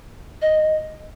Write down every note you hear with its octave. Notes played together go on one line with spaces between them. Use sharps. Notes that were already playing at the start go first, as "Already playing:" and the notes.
D#5